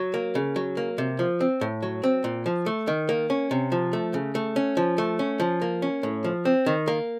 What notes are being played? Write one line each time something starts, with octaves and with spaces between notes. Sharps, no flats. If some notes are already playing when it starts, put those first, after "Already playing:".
Already playing: F#3
A#3
C#3
F#3
A#3
C3
F3
C4
A2
F#3
C4
A#2
F3
A3
D#3
A#3
C#4
C3
F3
A3
C#3
A3
C#4
F3
A3
C#4
F3
A#3
C#4
A2
F3
C4
D#3
A#3